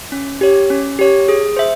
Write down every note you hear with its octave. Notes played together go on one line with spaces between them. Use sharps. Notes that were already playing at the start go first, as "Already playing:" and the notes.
C#4
G4 C#5
C#4
G4 C#5
G#4
C5 E5